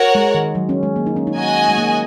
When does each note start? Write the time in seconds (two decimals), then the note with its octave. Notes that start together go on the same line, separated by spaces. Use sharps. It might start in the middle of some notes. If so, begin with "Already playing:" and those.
Already playing: F#4 A#4 C#5 F#5
0.15 G#3
0.34 D#3
0.55 F#3
0.69 C#4
0.83 G#3
0.96 A#3
1.06 D#4
1.16 C#4
1.27 D#4
1.37 F#4 D#5 G#5
1.68 G#3
1.78 A#3